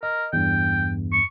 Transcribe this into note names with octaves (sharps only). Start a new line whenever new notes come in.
A#4 D#5
E2 G2 G5
C#6